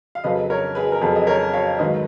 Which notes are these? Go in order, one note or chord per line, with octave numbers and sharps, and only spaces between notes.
F5
F2 C#3 F#3 B4 D#5
A#4 C#5
G#4 B4
A#4
F2 C#3 F#3 G#4 B4
D#5
A#4 C#5
C#5 F5
G#2 D#3 F#3 B4 D#5